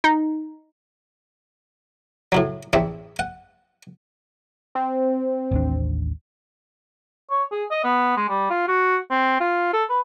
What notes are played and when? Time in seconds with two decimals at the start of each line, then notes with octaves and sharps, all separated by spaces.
0.04 D#4
2.32 A2 C#3 F#3
2.73 A1 E2 C4 E5
3.19 F#5
4.75 C4
5.51 A1 D#2 D4
7.30 C#5
7.52 G#4
7.71 D#5
7.84 B3
8.17 G#3
8.29 G3
8.50 F4
8.68 F#4
9.11 C4
9.40 F4
9.73 A4
9.90 B4